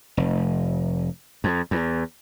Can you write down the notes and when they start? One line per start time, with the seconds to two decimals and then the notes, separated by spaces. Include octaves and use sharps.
0.17 F1
1.44 F2
1.71 E2